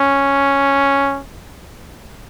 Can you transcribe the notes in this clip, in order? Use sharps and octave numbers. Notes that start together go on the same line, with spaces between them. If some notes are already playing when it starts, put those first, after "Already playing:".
Already playing: C#4